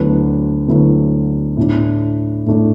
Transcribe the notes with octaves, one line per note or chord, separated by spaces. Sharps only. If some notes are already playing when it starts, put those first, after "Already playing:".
Already playing: D2 D3 F#3 B3 E4
D2 D3 F#3 B3 E4
A2 A3 D4
A2 A3 D4